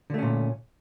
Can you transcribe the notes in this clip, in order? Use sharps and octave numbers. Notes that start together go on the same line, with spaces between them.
A#2 D3 A3 C#4